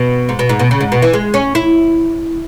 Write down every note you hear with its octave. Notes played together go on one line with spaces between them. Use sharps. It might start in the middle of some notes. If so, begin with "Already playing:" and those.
Already playing: B2
G#2
B2
G#2
B2
C#3
G#2
B2
E3
G#3
C#4
E4